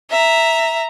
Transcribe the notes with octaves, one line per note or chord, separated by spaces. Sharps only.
E5 A#5